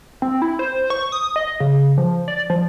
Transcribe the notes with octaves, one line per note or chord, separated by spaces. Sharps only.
C4
E4
C5
C#6
D#6
D#5
C#3
F3
D5
F3